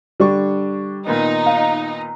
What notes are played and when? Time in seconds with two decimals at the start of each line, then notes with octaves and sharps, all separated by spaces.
0.20 D3 G3 D4 C#6
1.06 A#2 D#3 B3 D#4
1.46 F5